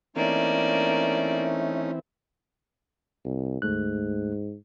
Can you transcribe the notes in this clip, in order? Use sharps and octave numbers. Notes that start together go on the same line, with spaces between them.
E3 A3 A#3 C4 C#4 D#4 E4 D5
C2
D2 G#2 A3 F#6